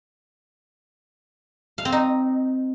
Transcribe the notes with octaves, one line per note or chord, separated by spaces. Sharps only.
F5
C4
D#4